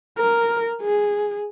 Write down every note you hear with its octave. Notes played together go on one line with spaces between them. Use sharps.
A#4
G#4